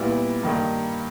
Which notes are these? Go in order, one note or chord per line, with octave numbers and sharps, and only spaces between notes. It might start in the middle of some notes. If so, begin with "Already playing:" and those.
Already playing: A#2 G3 B3 E4
G2 D#3 A#3